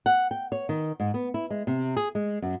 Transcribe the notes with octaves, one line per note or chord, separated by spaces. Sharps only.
F#5
G5
C#5
D#3
G#2
B3
E4
G#3
C3
G#4
G#3
F#2